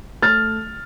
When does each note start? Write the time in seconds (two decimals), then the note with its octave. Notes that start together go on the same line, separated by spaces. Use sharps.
0.22 A3 F6 A6